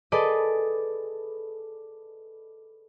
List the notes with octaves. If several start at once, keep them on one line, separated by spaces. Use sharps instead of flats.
G#4 A4 B4 D5 D#5